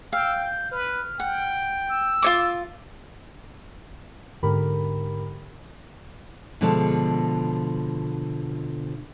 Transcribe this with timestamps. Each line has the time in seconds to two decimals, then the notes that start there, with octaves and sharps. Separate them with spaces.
0.13 F5 G5 E6
0.43 G6
0.72 B4 F6
1.20 F#5 G5
1.89 E6
2.22 F4 C#5 D6
4.43 G#2 D3 G4 A#4 B5
6.61 B2 D3 F3 G#3 A4